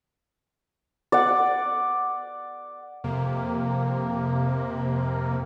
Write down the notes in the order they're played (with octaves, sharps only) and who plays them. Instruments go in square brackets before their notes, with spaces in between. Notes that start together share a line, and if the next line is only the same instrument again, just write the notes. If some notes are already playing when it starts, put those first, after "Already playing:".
[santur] D5 F#5
[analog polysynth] F2 C3 A#3